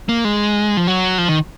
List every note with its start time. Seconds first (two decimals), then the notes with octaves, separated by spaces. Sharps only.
0.09 A#3
0.25 G#3
0.77 F3
0.87 F#3
1.18 F3
1.28 D#3